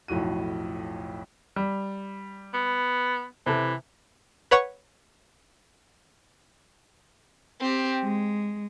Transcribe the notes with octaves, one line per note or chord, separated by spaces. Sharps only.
B1 F2 A2 F#4 D#7
G3
B3
C3 E3 A4
B4 C#5 F#5 C#6
C4 G4
G#3